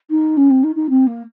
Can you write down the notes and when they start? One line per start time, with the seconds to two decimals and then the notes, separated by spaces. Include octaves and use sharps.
0.10 D#4
0.37 C#4
0.50 C4
0.63 D#4
0.75 D#4
0.89 C4
1.06 A#3